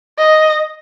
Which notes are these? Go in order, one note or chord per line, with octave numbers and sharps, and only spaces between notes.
D#5